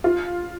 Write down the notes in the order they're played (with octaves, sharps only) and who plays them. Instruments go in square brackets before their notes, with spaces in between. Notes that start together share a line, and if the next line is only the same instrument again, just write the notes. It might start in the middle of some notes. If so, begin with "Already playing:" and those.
[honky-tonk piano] F4